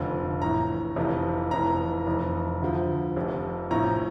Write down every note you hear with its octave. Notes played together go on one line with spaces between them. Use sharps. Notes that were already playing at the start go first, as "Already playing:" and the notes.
Already playing: F1 F2 D3 F3
A#1 A2 E3 A#5
F1 F2 C3 E3
F1 F2 E3 A#5
F1 F2 E3
D2 D3 F3
F1 F2 C3
A#1 A2 F3 A#5